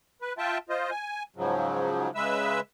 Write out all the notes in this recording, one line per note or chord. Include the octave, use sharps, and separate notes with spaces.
B4
F4 E5 G5 A5
F4 C5 D#5
G#5
G#2 C#3 F3 F#3
C#3 G#3 B4 E5 E6